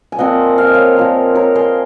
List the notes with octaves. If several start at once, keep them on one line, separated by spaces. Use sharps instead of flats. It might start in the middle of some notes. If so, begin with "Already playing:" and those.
G#5
A#2 F3 C4 D#5 F#5
F5
D#5
C#5 F5
A#2 F3 A#3
A#4 C#5
G#4 C5